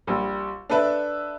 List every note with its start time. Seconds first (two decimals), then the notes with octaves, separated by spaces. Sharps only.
0.07 A#1 G3
0.70 D4 A4 B4 E5